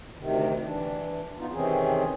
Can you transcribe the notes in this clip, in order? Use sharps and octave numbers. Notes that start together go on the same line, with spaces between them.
D2 C3 D#3
E3 D4
B3 D#4 F4
C3 D#3 E3 C4 C#4 G#4